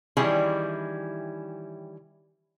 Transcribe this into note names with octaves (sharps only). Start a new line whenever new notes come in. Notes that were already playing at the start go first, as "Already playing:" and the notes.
D#3 E3 G3 C#4 E4 G#4